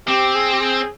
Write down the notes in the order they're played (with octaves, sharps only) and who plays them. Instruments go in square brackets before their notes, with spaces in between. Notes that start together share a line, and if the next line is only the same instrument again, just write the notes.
[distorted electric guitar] C4 [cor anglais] G4
[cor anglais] G#4
G4
G#4